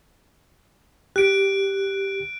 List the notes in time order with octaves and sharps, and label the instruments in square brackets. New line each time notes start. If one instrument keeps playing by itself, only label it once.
[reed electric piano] G4 [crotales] F#6 D7